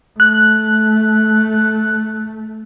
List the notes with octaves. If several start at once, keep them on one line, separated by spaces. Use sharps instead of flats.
A3 F#6